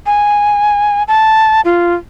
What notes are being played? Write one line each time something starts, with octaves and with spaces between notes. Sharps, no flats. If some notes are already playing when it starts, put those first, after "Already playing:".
G#5
A5
F4